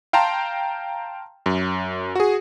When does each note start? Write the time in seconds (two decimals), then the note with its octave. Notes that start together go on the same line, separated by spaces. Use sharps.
0.13 F5 G5 A5 A#5 C6
1.46 F#2
2.15 F#4 G#4